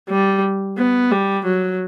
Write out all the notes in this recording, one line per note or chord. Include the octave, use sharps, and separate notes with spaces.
G3
B3
G3
F#3